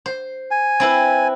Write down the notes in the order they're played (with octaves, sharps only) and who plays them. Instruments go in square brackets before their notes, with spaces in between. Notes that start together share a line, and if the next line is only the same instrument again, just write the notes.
[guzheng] C5
[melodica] G#5
[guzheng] C4 E4 B4